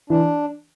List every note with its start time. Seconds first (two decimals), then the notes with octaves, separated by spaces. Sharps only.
0.10 E3 D4